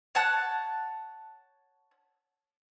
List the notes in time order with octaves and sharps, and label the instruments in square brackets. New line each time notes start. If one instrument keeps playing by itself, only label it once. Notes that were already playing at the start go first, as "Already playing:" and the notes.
[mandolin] C#5 F#5 A5 F#6